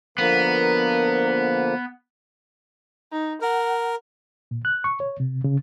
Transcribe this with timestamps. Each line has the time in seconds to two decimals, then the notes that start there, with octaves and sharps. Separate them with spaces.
0.18 D3 F3 A#3 B3 A#4
3.12 D#4
3.42 A#4 F#5
4.51 A#2
4.65 F#6
4.84 C#6
5.00 C#5
5.20 C3
5.44 C#3